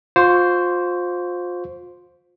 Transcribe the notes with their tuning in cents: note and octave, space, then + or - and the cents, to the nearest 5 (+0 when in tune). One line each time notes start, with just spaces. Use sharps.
F4 +30 C5 +0 C#6 +25